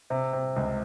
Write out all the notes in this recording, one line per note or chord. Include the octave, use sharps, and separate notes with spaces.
C3
C3
C#2